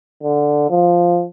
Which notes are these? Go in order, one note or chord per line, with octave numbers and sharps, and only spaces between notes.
D3
F3